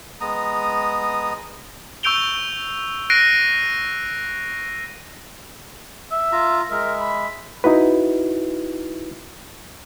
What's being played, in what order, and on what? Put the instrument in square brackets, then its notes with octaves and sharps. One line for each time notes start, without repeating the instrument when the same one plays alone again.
[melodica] G#3 B3 A#5 D#6
[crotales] C#6 E6 G6 D7 F7 G7
F#6 A#6 C7 D7 D#7
[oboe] E5
[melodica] F4 A#5
[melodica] G#3 E5 [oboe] A#4
[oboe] B5
[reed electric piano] D#4 E4 F#4 B4